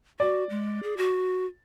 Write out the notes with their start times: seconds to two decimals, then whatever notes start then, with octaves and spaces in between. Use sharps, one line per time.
0.20 F#4 D5
0.50 G#3
0.83 G#4
0.97 F#4